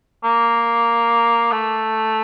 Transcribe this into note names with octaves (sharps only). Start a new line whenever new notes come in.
A#3
A3